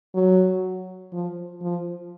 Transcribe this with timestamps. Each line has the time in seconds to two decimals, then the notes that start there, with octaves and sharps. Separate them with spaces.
0.15 F#3
1.13 F3
1.62 F3